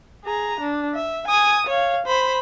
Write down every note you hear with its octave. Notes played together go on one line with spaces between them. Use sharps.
G#4 A#5
D4
E5
G#5 D#6
C#5 F5
C5 B5